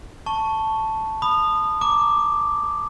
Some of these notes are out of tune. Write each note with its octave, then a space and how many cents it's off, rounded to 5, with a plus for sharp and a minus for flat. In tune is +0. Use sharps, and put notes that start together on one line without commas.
A5 +0 C#6 +0
B5 +0 D#6 -25
A#5 -10 D6 +0